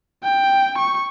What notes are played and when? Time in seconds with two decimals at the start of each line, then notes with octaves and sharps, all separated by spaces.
0.24 G5
0.78 C#6